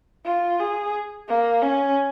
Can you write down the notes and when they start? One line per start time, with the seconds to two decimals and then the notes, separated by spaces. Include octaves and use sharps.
0.25 F4
0.60 G#4
1.28 A#3
1.62 C#4